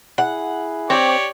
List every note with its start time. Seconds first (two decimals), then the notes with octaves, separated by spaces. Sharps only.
0.18 E4 G#4 F#5
0.90 C4 G4 C#5 D5